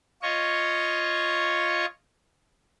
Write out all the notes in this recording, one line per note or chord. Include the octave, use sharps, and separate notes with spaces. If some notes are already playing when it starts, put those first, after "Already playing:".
F4 C#5 D#5 C#6